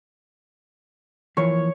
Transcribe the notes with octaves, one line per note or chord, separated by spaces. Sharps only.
E3 F3 A#3 C#5